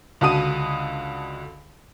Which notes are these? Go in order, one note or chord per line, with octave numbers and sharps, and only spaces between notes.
C#2 D3 F#4 A5 D#6 D#7